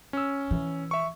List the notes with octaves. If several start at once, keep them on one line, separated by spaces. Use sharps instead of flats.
C#4 E6
E3
E5 C#6